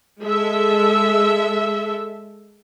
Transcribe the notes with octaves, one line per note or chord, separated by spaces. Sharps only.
G#3 A4 E5